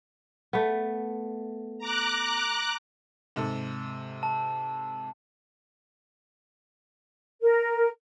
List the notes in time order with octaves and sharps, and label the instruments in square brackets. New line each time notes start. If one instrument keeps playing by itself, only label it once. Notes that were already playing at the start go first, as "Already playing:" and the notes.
[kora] A3 B3
[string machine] A#5 D6 F#6
[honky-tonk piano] G#2 C3 A4
[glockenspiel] A5
[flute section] A#4